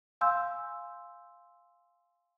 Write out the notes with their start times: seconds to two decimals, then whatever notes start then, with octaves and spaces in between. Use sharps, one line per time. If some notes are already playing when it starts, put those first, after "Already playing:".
0.21 F5 G#5 C6 E6 G6